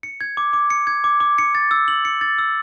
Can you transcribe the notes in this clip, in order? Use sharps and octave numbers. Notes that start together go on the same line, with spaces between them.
C#7
G#6
D6
D6
C#7
G#6
D6
D6
C#7
A6
E6
F#7
C#7
A6
E6